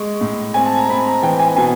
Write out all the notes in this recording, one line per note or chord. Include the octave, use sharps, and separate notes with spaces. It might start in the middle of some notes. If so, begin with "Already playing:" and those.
Already playing: G#3 C#6
A2
C4 G#5
A5
A#5
C4 B5
A#5
E3 G5
G#5
B2 G#5